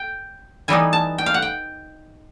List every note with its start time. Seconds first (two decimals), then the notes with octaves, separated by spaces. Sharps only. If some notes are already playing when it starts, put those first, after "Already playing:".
Already playing: G5
0.68 E3 G3 B3 D#4 G#5
0.93 A5
1.18 G5
1.26 F5
1.34 F#5
1.42 G5